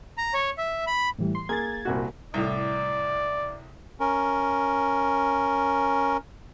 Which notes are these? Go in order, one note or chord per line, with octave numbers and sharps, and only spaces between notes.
A#5
C#5
E5
B5
A2 E3 G3
C6
A#3 G#4 G#6 A6
C2 A#2 F#4
C2 A2 D5
C#4 A#4